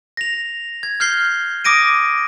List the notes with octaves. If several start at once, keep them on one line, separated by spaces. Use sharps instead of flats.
A#6 F7
G#6
F6 G6 C7 G7
D6 D#6 A#6 D7 D#7